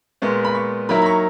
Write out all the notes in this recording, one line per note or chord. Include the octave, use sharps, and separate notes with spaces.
A#2 G#3 B3 C#6
B5
C#6
D#3 F#3 A#3 E4 B5
B5
C#6